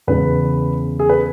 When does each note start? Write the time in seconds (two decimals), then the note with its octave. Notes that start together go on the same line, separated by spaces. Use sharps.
0.07 E2 C#3 G#3 B4
0.99 G#4
1.09 B4